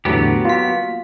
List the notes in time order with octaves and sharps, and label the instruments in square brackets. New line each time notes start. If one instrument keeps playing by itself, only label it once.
[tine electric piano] E2 A2 D3 [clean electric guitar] F#3 B3 G4
[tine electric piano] A#3 B6 [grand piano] F4